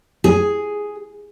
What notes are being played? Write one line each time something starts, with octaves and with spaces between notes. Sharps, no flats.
G#4